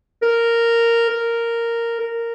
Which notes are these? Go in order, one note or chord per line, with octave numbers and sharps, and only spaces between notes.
A#4
A#4
A#4